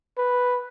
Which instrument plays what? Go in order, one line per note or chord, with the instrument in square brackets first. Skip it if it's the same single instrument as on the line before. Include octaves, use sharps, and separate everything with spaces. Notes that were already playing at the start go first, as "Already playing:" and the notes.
[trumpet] B4